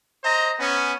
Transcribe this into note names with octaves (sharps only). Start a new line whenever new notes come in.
C5 D#5 A#5
B3 C#4